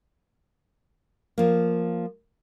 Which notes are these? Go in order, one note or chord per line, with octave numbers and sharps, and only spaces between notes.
F3 A#3